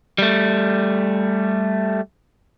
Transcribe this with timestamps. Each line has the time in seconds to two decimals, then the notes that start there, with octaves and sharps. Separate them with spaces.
0.18 G3 A3